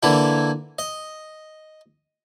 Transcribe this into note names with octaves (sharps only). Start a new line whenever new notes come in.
D3 E3 A#3 E4
D#5